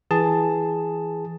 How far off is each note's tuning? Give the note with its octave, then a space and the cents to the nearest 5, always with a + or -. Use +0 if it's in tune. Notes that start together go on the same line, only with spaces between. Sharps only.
E3 +0 G#4 +0 A5 +5